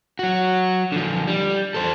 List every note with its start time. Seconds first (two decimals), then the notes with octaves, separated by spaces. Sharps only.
0.19 F#3 F#4
0.92 D3 F3
1.27 G3
1.74 A4 C5